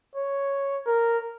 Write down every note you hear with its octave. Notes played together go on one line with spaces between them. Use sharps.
C#5
A#4